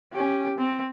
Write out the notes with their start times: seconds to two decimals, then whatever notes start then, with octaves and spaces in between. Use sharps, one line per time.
0.13 C#4 G4
0.58 C4